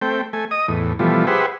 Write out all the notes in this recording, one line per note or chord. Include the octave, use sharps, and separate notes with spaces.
A3 C4 G5
A3 G#5
D#5 D#6
E2 A2
B2 E3 F3 G3 A3
G4 G#4 B4 C5 E5 F#5